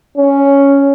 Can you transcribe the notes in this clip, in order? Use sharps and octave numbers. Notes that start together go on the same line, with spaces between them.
C#4